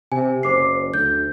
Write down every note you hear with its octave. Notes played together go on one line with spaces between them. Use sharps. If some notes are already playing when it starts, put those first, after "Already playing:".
C3 G#5
F#1 C5 D6 C7
D2 G6